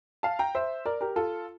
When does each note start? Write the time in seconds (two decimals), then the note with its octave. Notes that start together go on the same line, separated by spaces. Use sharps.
0.23 F5 A5
0.39 G5 A#5
0.55 C5 E5
0.86 A#4 D5
1.01 G4 A#4
1.16 F4 A4